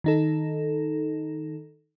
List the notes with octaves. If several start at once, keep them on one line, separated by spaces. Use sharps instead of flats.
D#3 D#4 A4